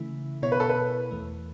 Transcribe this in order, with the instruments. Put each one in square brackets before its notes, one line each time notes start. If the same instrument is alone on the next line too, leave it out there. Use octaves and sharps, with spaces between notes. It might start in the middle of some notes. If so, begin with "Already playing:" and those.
Already playing: [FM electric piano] C#3 E3 A3 E4
[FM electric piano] B2 B3 E4 [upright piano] C#5
[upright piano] B4
A4
B4
[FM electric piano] E2 E3 A3